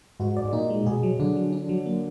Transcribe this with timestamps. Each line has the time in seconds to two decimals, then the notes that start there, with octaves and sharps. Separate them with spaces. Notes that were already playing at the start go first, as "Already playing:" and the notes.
0.20 G#2 F#4
0.37 D5
0.42 G#2
0.53 A#2 D#4
0.70 G#3
0.86 B2 G#4
1.03 F#3
1.19 D3 D4
1.37 F#3
1.52 D4
1.69 F#3
1.86 A#3